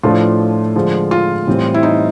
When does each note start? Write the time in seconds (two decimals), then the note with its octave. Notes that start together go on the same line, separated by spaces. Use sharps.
0.03 A2 F3 A3 D4 F4
0.75 D3 F3 G#3
1.11 F4
1.47 A2 E3 G3 C4
1.74 E4
1.83 D#4